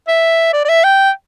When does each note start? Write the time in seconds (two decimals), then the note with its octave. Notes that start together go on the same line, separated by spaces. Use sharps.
0.08 E5
0.53 D5
0.65 D5
0.69 E5
0.84 G5